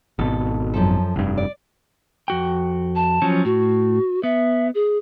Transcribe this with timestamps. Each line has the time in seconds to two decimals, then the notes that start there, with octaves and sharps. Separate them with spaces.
0.19 G#1 B2 A4
0.74 F#2 F3 A4
1.16 F1 G2
1.37 D5
2.28 F2 F#4 G5
2.96 A5
3.22 F3 F#3 C#4
3.45 A2 F#4
4.23 B3 E5
4.75 G#4